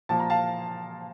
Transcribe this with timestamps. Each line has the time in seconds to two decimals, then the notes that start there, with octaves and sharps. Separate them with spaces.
0.09 A#2 F3 A#3 A5
0.20 A#5
0.30 F5 A5